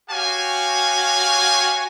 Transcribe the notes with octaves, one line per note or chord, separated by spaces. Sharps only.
F#4 G4 C#5 F5 G#5